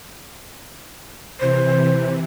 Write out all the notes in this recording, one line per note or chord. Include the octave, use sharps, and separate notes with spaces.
C3 E3 C5